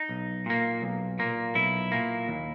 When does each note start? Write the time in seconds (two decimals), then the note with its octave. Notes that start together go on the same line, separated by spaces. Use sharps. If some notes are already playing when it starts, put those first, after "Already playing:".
Already playing: D#4
0.09 B1
0.46 A#2 A#3
0.82 B1
1.19 A#2 A#3
1.55 B1 E4
1.92 A#2 A#3
2.28 D#2